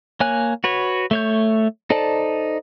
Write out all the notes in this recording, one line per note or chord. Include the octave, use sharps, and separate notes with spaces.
A#3 C#5 G#5 F#6
F#4 B4 C#5
A3 C#5 G6
D#4 A4 C5 D5 A5